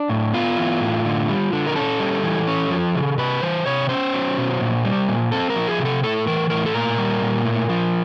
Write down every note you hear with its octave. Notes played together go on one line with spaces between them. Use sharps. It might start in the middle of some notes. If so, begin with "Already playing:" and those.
Already playing: D4
A2
B3 F4
E3
A2
D3
G3
D3
A#4
C#4 A4
G3
E3
C#4
F3
C#3
C3 B4
E3 C5
C3 C#5
C#4 C5
F#3
B2
A#2
G3
A#2
C4 A4
A#4
F3
G#4
C3
A4
A2 A4
E3 A#4
A2 A#4
A4
A#2 A#4
G3
A#2
A2
F3